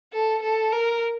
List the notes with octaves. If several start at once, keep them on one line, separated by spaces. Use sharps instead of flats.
A4
A4
A#4